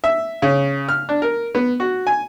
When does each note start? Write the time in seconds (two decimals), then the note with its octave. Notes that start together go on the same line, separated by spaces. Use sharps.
0.04 E5
0.42 C#3
0.89 F6
1.09 D4
1.22 A#4
1.55 B3
1.80 F#4
2.07 G#5